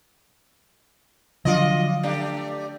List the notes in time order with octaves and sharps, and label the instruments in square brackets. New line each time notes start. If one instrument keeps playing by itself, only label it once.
[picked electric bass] D3 F3 F#3 [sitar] F4 D5 D#5
[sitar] A3 D4 G4